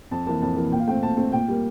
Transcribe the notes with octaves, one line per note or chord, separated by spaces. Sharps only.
F2 A5
E3 A#3 A5
F2 A5
E3 A#3
A#2 G5
F5
A3 C4 G5
A#2 A5
A3 C4
A#2 G5
G3 A#3